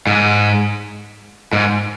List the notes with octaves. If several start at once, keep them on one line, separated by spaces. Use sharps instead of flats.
G#2
G#2